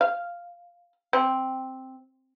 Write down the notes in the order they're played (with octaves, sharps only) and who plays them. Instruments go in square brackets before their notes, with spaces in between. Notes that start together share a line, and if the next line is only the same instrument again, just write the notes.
[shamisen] F5
C4